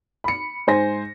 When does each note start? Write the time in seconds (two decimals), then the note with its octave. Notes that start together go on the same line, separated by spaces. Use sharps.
0.24 B5 C#7
0.67 G#2 C5 G#5 A#6